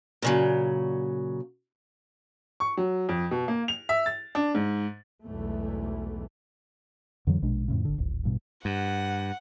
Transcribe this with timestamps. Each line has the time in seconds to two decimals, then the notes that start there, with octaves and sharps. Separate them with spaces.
0.22 A#2 C#3 F#3
2.60 C#6
2.77 F#3
3.09 F2
3.31 B2
3.48 A#3
3.68 F7
3.89 E5
4.06 A6
4.35 D4
4.55 G#2
5.23 B1 E2 G#2 E3 A3
7.27 F2 D3 E3 F#3
7.42 A#1 B2 G#3 D4
7.68 F2 A2 C#3
7.85 G#1 D3
7.98 D1 G#1
8.24 A1 G2 B2
8.65 G2 F#5